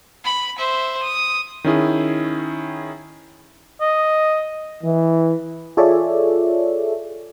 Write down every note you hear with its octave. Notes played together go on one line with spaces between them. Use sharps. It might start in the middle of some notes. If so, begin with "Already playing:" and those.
B5
C5 E5
D#6
D#3 C#4 E4 G#4
D#5
E3
F4 G#4 A4 C#5 D5 E5